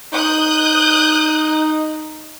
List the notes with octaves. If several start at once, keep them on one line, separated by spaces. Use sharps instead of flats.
D#4 D#6 F#6 G6